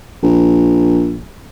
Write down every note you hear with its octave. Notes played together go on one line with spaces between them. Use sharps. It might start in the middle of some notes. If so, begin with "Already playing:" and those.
A#1